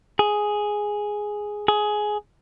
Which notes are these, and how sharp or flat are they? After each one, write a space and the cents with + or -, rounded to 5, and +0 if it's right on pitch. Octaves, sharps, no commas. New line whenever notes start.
G#4 +0
G#4 +15